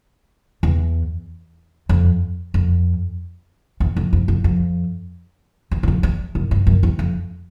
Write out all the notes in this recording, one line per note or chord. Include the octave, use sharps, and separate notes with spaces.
E2
F2
F2
E2
F2
F2
F2
F2
E2
F#2
F2
E2
F#2
G2
F#2
E2
F2